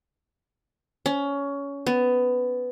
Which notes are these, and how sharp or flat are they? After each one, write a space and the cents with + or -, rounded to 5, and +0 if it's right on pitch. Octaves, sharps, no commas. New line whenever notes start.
C#4 +20
B3 +15